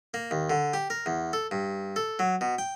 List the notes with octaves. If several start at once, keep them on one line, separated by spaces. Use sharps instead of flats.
A#3
D#2
D3
G4
A#4
E2
A4
G2
A4
F#3
B2
G5